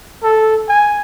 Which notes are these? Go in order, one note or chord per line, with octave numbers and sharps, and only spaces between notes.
A4
G#5